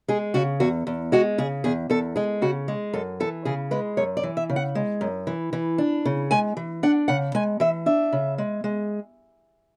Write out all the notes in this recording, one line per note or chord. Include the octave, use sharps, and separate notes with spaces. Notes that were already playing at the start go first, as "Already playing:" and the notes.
G#3 G#4
C#3 F#4
E2 F#4
E2
G#3 F#4
C#3 G#4
E2 G#4
E2 A4
G#3 G#4
C#3 F#4
G#3
F#2 A4
E3 A4
C#3 G#4
G#3 B4
F#2 C#5
D5
E3
E5
C#3
F#5
G#3
F#2
E3
E3
D4
C#3
G#3 G#5
E3
D4 F#5
C#3 F#5
G#3 G#5
E3 E5
D4 E5
C#3
G#3
G#3